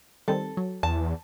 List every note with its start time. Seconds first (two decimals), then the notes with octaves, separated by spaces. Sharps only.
0.28 D#3 G3 C4 A4
0.57 F#3
0.83 E2 A5